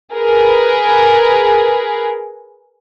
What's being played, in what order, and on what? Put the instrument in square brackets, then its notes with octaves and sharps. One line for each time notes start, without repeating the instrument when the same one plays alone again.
[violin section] G#4 A#4 B4